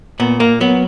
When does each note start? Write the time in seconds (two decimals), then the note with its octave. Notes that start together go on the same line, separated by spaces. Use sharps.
0.20 A#2 B3
0.40 A#3
0.61 F#3 B3